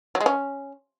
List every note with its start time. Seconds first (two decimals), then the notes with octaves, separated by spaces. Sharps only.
0.15 F#3
0.21 G#3
0.26 C#4